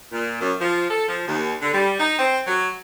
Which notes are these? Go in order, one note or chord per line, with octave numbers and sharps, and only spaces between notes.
A#2
F#2
F3
A4
F3
D#2
D3
G3
D#4
C4
F#3